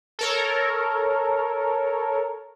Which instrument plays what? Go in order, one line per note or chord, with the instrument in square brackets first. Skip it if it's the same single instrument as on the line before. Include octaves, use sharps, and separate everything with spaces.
[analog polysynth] A4 A#4 C#5